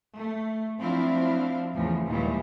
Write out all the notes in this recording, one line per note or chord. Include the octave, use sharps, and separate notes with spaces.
A3
F3 F#3 C4 D4 E4 F5
E2 A2 C#3 F3
D#2 A#2 D#3 E3 G3 G#3